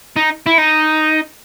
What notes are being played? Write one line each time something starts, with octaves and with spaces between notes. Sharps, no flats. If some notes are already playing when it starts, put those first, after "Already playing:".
D#4
E4
D#4